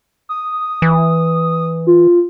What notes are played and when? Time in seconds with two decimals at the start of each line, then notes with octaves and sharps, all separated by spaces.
0.29 D#6
0.82 E3
1.87 F4